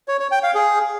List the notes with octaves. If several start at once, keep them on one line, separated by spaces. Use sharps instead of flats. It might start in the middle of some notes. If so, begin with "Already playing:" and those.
C#5
C#5
G5
F5
G#4